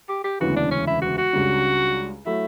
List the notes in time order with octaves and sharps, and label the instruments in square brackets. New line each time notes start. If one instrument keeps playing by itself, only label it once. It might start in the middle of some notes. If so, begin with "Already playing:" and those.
[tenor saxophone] G4
G4
[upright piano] E1 D2 C#3 E3 B3 [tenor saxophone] F#4
[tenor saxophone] D4
C#4
E4
F#4
F#4
[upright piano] C#2 C#3 G3 D4
[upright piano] F#3 A3 [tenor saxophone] E4